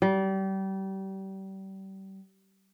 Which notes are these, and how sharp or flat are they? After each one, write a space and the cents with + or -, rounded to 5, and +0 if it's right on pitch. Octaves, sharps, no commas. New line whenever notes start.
G3 -30